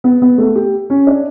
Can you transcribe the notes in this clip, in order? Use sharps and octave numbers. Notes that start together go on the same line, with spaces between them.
B3
B3
A3
G4
C#4
D4